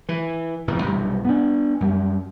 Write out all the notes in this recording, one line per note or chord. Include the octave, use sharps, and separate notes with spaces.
E3
F1 E2 A2 E3
B1 G2 C3 E3
B3 D4
F#2 G3